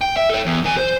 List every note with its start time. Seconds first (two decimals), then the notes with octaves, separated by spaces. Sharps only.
0.01 G5
0.17 E5
0.30 A4 C#5
0.46 E2
0.64 D#3 G#5
0.77 C5